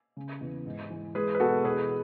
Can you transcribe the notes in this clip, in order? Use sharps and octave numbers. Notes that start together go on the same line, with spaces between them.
C#3
E2
G#2
E3
G#3 G#4 B4
B4
B2 F#4 A4
E2 G#4 B4